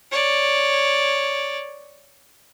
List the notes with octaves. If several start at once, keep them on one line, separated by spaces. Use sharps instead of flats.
C#5 D5